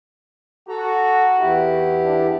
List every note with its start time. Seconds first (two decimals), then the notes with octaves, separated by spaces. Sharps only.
0.69 F#4 A4 A#5
1.39 E2 E4 G4
2.04 D4